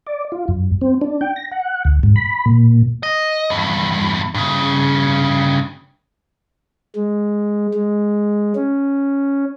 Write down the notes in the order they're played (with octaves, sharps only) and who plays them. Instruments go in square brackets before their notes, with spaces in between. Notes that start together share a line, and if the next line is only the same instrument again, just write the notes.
[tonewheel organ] D5
F4
F#2
C4
D4
G5
A#6
F#5
D2
G#2
B5
A#2
[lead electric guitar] D#5
E2 G2
G2 C#3
[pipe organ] G#3
G#3
C#4